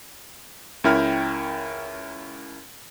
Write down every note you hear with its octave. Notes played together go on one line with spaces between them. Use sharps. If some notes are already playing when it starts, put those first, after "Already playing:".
C#2 C#4 E4 A#4 G5 F6